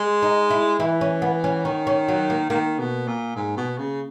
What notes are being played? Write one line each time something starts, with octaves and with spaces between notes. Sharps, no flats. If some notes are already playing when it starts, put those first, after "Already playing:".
Already playing: G#3
D#4
E4
E3 E4
C#4
B3
C#4
D#3 C#4
C#4
F#3
A#3
D#3 A#3
B2
A#2
G#2
B2
C#3